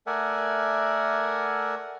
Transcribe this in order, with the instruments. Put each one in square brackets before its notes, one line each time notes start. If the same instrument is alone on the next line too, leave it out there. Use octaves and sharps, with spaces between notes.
[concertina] A3 A#4 D5 E5 F#5 G#5